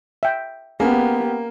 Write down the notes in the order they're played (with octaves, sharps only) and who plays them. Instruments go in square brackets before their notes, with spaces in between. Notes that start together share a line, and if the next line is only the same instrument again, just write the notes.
[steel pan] E5 G5
[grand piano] A#3 [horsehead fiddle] B3 G4 [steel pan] C#4 G#4